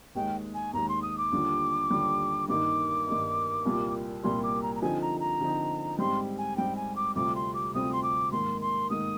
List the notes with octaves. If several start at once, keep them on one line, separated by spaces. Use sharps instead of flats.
D#2 D#3 G#3 G5
G#5
D#2 D#3 G#3 A#5
C6
D#6
D6
D#2 D3 G3 D4 F4
D#2 D3 G3 D4 F4
G2 D#3 A#3 D#4 D6
G2 D#3 A#3 D#4
C2 A#2 G3 A#3 F4
C2 A#2 G3 A#3 F4 C6
D6
A#5
A#5
D3 F3 C4 D#4 G#5
A#5
A#5
D3 F3 C4 D#4
G#2 G3 C4 G4 C6
G#5
G#2 G3 C4 G4 G5
G#5
D6
D2 C3 G3 C4 F4 D6
C6
D6
D2 C3 G3 C4 F4 D#6
C6
D6
G#2 D#3 A#3 C6
C6
G#2 D#3 A#3 D#6